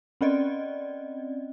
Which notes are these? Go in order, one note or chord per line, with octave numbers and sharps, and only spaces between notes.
C4 C#4 D5 D#5